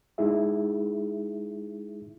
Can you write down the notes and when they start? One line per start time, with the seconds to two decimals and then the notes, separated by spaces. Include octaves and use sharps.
0.18 G#3 D#4 E4 G#4 E5